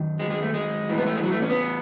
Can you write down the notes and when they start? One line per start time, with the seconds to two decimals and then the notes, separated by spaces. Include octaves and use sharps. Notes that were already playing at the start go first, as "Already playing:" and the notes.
Already playing: F#2 D#3
0.19 G#3
0.30 G#3
0.42 A3
0.54 G#3
0.89 A2 E3
0.97 B3
1.06 A3
1.15 G#3
1.23 F#3
1.32 A3
1.42 C#4
1.50 B3